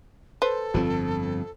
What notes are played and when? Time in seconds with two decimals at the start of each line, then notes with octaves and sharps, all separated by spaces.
0.42 A4 B4 C5
0.74 G1 F2 F3 C4